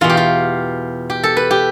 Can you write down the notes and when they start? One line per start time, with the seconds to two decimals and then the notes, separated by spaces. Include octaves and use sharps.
0.01 E2 B2 F4
0.09 G4
0.17 F4
1.10 G4
1.23 A4
1.37 B4
1.51 G4